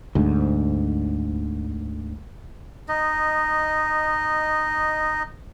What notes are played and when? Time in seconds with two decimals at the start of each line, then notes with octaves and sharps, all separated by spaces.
0.15 D2 G#2
2.89 D#4 D#5